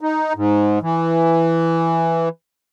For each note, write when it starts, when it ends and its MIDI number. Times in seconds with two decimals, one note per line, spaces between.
0.01 0.33 63
0.35 0.79 44
0.82 2.29 52